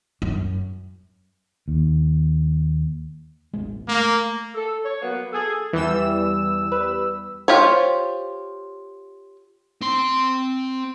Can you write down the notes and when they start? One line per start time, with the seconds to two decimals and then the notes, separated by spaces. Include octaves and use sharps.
0.22 F#2
1.68 D#2
3.53 E1 A1 G#3
3.88 A3 A#3
4.55 A4
4.84 C#5
5.01 F#3 A#3 B3
5.33 G#4 A4
5.73 E2 E3 G3 E6
6.72 B4
7.48 F4 G4 C5 C#5
9.81 C4 C6